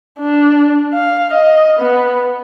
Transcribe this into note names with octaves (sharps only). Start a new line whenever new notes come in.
D4
F5
D#5
B3